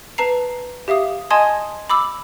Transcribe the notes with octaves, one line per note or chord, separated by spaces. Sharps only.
B4 A5 A#5 C7
G4 E5 F5 D#6
D#5 G#5 A5 C6 D#6 G#6
B5 D6 E6 F#7